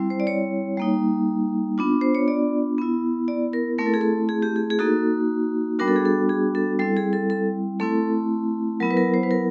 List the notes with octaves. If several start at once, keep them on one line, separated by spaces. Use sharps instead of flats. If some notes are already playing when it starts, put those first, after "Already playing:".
Already playing: G3 C4 E4
C5
D5
C#5
G3 A#3 D#4
B3 D4 F4
C5
C#5
D5
B3 E4
D5
A#4
A3 C4 E4 A#4
A4
G#4
A4
G#4
G4
G#4
G#4
A#3 D#4 F#4 A4
G3 B3 D4 F#4 A#4
A4
G#4
A4
G#4
A4
G3 C4 E4 A4
G#4
A4
A4
A3 C4 E4 A4
F#3 B3 E4 A#4
B4
A#4
C5
B4
A#4